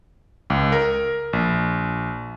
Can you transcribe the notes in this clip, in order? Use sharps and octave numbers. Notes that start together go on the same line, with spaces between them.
C#2
A#4
A#1